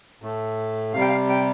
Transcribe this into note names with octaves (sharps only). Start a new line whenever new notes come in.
A2 A3
C3 G3 F5 G5
F5
G5